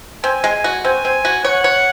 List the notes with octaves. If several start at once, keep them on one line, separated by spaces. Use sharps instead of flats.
C4 G#5
G#3
F#4
C4 G#5
C4
F#4
C#5 F#5
C#5